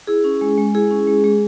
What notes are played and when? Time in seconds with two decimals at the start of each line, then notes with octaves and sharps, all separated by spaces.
0.07 E4 G#4
0.24 C#4
0.41 G#3
0.58 G#3
0.74 E4 G#4
0.91 C#4
1.07 G#3
1.24 G#3